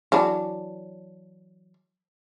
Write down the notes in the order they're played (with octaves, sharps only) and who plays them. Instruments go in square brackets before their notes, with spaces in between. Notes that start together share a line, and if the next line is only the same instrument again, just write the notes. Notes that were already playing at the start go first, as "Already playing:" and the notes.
[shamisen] E3 F#3 D4